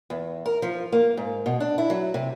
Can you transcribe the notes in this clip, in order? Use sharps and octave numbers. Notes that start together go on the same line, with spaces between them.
E2
A#4
F3
A#3
G#2
B2
D4
E4
F#3
C3